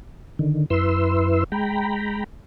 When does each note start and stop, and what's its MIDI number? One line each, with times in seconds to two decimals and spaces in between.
0.39 0.66 50
0.39 0.66 51
0.70 1.44 42
0.70 1.44 64
0.70 1.44 71
0.70 1.44 84
0.70 1.44 88
1.52 2.24 56
1.52 2.24 79
1.52 2.24 82
1.52 2.24 83